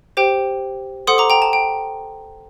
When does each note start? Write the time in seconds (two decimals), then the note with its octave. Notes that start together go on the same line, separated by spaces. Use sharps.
0.17 G4 C5 G5
1.07 A4 C5 F#5 C6 D#6
1.18 A#5 D6
1.30 G5 A#5
1.42 A5
1.53 G5